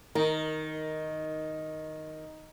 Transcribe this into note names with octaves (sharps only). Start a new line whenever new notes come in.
D#3 A#4